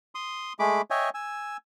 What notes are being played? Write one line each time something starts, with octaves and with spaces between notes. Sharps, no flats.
C6 D#6
G#3 A3 G#4 B5 D6
C#5 D#5 E5 G5 G#5
G#5 E6